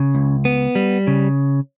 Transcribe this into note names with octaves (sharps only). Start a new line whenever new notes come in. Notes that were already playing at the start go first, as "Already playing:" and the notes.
Already playing: C#3
C#2
B3
G3
C#3